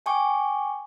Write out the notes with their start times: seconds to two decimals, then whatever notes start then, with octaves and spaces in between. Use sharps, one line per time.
0.06 G5 G#5 C#6 D6